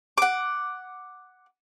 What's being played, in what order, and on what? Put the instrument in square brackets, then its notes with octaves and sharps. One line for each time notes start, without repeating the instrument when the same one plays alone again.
[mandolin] F#5 D6